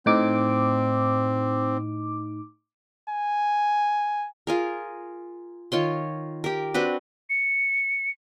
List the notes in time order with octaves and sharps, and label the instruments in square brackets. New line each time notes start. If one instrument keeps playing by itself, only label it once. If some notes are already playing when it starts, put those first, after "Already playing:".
[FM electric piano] A2 D#4 D6 [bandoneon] C4
[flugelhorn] G#5
[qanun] F4 G#4 A#4
D#3 F4 C#5 C6
G4 A#4
C4 D4 F#4 B4
[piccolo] C#7